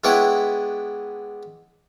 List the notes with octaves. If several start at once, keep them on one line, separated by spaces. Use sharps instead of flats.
G#3 B3 D4 E4 C#5 G5